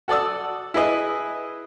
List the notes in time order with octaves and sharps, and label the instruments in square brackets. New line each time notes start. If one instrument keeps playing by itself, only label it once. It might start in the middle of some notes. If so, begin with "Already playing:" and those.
[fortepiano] F#4 A4 D5 D#6 E6
E4 G#4 B4 D#5